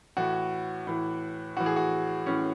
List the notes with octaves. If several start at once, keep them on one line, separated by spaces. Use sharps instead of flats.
A2 E3 F#4
A2 E3
A2 E3 F#4
G#4
F#4
A2 E3 C#4